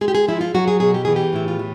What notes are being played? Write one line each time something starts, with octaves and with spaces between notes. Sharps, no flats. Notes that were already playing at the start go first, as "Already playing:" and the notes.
G#3 G#4
G4
G#4
F3 E4
F4
F#3 F#4
G#4
B2 G#4
G4
E3 G#4
G4
A2 E4
F4
E3